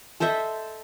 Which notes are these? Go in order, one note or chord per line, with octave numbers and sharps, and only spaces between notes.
A4 C5 D#5 E5